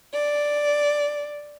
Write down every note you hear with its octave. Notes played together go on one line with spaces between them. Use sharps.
D5